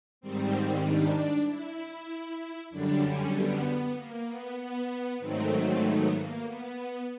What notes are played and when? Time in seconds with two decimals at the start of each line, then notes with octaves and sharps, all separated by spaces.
0.21 G#2 D#3 G3 C4
0.84 D4
1.46 E4
2.70 F#2 D3 G3 D4
3.02 C#4
3.33 B3
3.95 A#3
4.27 B3
4.57 B3
5.19 G#2 D#3 F#3 A3 C4
5.51 C4
5.81 B3
6.13 A#3
6.44 B3